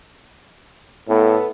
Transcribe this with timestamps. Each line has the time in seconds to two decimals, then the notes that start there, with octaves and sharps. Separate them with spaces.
1.09 A2 B3 A4